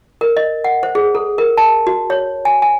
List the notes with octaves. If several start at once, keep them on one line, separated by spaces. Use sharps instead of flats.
A#4
D#5
F#5
C5
G#4
A4
A#4
A5
F#4
C#5
G#5
G#5